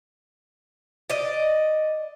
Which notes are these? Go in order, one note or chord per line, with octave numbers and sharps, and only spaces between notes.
D5 D#5